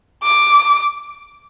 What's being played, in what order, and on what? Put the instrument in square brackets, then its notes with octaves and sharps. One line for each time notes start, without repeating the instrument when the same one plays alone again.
[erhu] D6